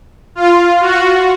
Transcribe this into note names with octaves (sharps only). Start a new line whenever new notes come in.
F4
F#4